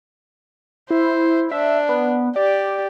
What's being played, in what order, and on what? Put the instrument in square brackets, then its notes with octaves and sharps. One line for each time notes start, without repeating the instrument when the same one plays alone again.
[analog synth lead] E4 [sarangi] C5
[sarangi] D4 [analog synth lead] E5
[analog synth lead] B3
[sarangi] G4 [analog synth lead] D5